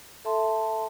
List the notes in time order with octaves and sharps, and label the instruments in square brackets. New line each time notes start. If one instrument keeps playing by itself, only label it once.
[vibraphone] A4 E5 A5 C6